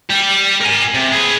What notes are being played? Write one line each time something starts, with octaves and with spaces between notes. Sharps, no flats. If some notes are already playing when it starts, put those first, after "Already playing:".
G3 G4
A#4 G#5
C3
G#4 B4